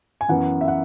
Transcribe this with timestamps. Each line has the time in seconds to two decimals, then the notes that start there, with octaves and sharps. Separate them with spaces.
0.21 G#5
0.28 F#2 E3 B3 F#5
0.61 E5
0.68 F#5